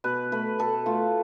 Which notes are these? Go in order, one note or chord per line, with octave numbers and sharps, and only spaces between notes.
B2 B4
A3 B4
B2 A4
A3 F4